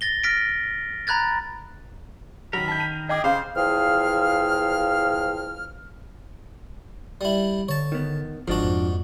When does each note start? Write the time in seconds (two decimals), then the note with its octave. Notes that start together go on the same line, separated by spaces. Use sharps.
0.01 A6 A#6 G7
0.23 F6 A#6 B6 D7
1.07 A#5 B5 F#6 G#6 A6
2.53 D#3 F#3 A#4 B5
2.68 A5 G6
2.80 D#7
3.09 G#4 D#5 G5 D6
3.24 C#3 C5 F5
3.56 E2 F3 G#4 F5 G5 F6
7.21 G3 E4
7.69 D3 C#5 A5
7.92 D#3 B3
8.48 G1 G#2 F3 D4 F#4
8.64 F2